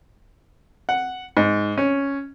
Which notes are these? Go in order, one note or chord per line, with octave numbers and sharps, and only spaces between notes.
F#5
G#2
C#4